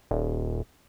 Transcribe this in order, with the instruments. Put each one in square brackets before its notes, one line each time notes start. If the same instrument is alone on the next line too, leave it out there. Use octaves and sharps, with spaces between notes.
[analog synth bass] D#1